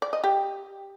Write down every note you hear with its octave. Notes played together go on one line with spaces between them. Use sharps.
D5
D#5
G4